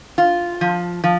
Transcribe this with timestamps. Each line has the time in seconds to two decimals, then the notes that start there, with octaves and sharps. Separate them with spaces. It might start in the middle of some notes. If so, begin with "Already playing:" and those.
0.18 F4
0.61 F3
1.04 F3